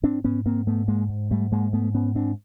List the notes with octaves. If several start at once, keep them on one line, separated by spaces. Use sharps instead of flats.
G#2 C4 D4
G#2 B3 C#4
G#2 A#3 C4
G#2 A3 B3
G#2 G#3 A#3
G#2
G#2 G3 A3
G#2 G#3 A#3
G#2 A3 B3
G#2 B3 C#4
G#2 C4 D4